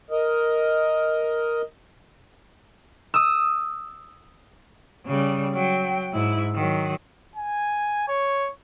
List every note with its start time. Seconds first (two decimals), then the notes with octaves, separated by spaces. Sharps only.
0.11 A#4 D#5
3.14 D#6 E6
5.06 C#3 G3
5.53 F#3 G5
6.12 G#2 E4
6.55 D#3 F#3
7.36 G#5
8.08 C#5